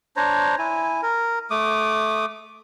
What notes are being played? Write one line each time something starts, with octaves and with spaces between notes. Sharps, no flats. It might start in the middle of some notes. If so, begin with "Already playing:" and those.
D4 C5 C#5 A#5
E4 G#5
A#4
A3 D6 D#6